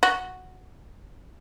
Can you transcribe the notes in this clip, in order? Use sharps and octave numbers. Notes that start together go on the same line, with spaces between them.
F#4